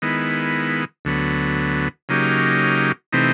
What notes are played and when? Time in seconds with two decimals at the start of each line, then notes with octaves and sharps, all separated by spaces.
0.02 D#3 G#3 B3 E4
1.05 D2 D3 F#3 B3
2.09 C#3 F#3 A#3 D#4 G4
3.13 C3 E3 A3 C4 D#4